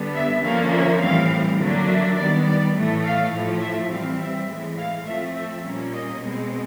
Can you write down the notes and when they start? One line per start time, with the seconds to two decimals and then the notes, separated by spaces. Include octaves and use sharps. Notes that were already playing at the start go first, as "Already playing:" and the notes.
Already playing: D3 G3 B3 D4
0.15 E5
0.44 D3 F3 A#3 C#4 F5
0.72 E5
1.02 A2 E3 G3 C4 F5
1.59 D3 F#3 A#3 D4
1.89 E5
2.17 D#3 G3 B3 D5
2.46 D5
2.75 A2 E3 A3
3.04 F5
3.32 A2 F3 A3
3.61 E5
3.91 E3 G3 C4 F5
4.19 E5
4.48 A2 E3 G#3 E5
4.77 F5
5.06 F3 A3 C4 E5
5.34 E5
5.63 A#2 G3 A#3 C#4
5.93 D#5
6.21 B2 G#3 C4